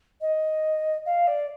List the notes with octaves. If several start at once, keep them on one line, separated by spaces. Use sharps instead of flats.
D#5
F5
D5